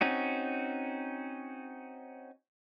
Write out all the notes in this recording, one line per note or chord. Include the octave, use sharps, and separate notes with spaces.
C4 C#4 D#4 F#4